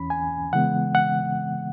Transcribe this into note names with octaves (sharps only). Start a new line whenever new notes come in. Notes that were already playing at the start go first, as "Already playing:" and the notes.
Already playing: E2 E3 C#4 B5
G#5
C#3 E3 G#3 B3 F#5
F#5